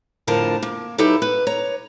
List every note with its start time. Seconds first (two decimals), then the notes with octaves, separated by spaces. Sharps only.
0.27 F2 A2 D3 F4 A#4 A5
0.63 A#3
0.98 F#3 D#4 E4 G4 A4 B4
1.22 B4
1.47 C#5 A#5